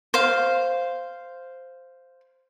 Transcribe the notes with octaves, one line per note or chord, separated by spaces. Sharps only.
C5 F5